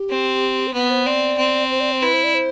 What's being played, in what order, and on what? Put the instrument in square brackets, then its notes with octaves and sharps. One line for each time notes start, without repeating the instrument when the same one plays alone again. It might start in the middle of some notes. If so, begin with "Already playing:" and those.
Already playing: [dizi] G4
[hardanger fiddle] C4
[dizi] C5
[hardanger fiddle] B3 [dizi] B4
[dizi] C5
[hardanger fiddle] C4 [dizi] D5
[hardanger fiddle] C4
[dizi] C5
D5
C5
[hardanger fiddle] E4 [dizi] B4
[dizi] C5
D5
C5